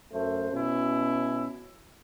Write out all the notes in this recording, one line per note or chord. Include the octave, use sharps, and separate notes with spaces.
F#2 A3 C5
B2 C#4 E4